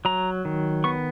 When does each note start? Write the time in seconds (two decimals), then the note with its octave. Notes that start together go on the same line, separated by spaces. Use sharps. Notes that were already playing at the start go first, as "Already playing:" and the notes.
0.05 F#3 A#5
0.45 D#3
0.84 B3 C#6